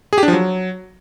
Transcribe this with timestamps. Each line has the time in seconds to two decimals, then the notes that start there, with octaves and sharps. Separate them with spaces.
0.13 G#4
0.18 G4
0.23 D4
0.28 F3
0.33 F#3